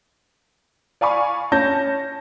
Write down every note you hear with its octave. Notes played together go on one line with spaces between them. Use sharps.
D5 F5 G#5 B5 C#6
C#4 A5 G6 A#6